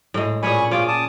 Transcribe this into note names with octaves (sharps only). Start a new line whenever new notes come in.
A2 G#3
A#2 C#4 G#4 G#5 B5 C#6
C#4 F4 G#4 D6
A5 D6 D#6